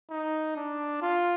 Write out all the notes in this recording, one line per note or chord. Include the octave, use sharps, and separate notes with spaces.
D#4
D4
F4